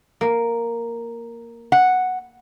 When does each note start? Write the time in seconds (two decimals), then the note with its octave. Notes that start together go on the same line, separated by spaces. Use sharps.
0.21 A#3
1.72 F#5